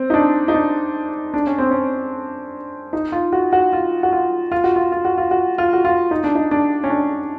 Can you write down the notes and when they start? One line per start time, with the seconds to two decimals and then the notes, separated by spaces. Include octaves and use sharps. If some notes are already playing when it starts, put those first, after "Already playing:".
Already playing: C4
0.10 D#4
0.14 D4
0.48 D#4
0.54 D4
1.34 D4
1.47 C#4
1.58 C4
1.71 C#4
2.93 D#4
3.12 F4
3.33 F#4
3.53 F#4
3.73 F4
4.03 F#4
4.12 F4
4.52 F4
4.64 F#4
4.76 F4
4.92 F4
5.05 F#4
5.18 F4
5.31 F#4
5.58 F4
5.73 F#4
5.85 F4
6.11 D#4
6.24 D4
6.35 D#4
6.51 D4
6.84 C#4
6.90 D4